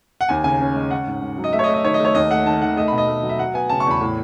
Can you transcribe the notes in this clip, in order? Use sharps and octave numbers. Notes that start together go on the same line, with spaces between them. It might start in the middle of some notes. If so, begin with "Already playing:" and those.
F#5
D#2 G#5
C#3 G#5
C#4
G#3
C#4 F#5
G#2
G#2
F#3
D#5
A3 E5
C#5
D#5
A3
D#5
D#3 C#5
D#5
A3 C#5
D#2 D#5
A3 F#5
D#3 A5
D#3 F#5
A3 D#5
B2 B5
D#5
A3
F#3
E5
F#3 F#5
B3 G#5
C#3 A5
C#6
E2 B5
A2